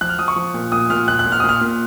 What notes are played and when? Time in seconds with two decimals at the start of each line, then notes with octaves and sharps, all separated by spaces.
0.01 F3 F#6
0.09 F6
0.19 F3 D#6
0.28 C#6
0.36 F3
0.54 A#2
0.72 A#2 D#6
0.90 A#2 F6
1.08 A#2 F#6
1.19 F#6
1.26 A#2
1.32 F6
1.40 D#6
1.44 A#2
1.49 F6
1.61 A#2